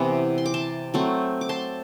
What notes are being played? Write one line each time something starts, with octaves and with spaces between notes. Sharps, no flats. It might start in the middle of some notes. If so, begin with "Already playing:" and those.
Already playing: C3 E3 B3 E5 F#5
C6
D6
A5 C6
F#3 A3 C4
D6
A5 C6